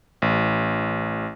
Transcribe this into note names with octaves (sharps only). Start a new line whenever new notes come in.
A1